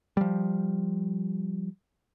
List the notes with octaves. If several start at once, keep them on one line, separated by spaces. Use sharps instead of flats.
F3 G3